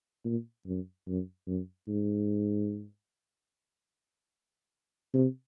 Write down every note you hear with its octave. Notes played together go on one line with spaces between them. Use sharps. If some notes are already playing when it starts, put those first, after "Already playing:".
A#2
F#2
F#2
F#2
G#2
C3